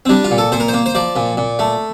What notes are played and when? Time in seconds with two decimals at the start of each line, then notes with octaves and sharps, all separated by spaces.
0.06 C4
0.09 G3 D4
0.24 F4
0.31 A#2
0.38 A4
0.52 A#2 C5
0.60 A#4
0.68 C5
0.74 A#3
0.86 C5
0.95 F3 D5
1.16 A#2
1.37 A#2
1.59 A3